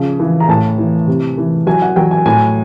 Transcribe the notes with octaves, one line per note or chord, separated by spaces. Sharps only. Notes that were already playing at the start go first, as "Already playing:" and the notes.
Already playing: C#3 F3
E3
A#5
A2 A5
E3
C3
E3
F#3 G#5
F#5
F#3 G5
G#5
A2 G#5